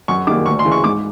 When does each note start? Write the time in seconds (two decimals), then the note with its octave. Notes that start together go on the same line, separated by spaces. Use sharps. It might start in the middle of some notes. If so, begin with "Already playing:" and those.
0.08 F#2 C#6
0.27 D#3 G3 A#3 D6
0.46 D2 C#6
0.59 C6
0.65 C#3 E3
0.72 C#6
0.84 G#2 D6